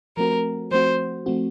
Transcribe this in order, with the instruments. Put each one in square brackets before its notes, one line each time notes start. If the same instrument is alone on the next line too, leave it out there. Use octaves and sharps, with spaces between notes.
[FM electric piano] F3 A3 C4 F#4 [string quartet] A#4
[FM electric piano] F3 A3 C4 F#4 [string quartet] C5
[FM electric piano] F3 A3 C4 F#4